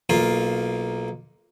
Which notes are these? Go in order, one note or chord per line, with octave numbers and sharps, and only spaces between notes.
B1 A#3 F4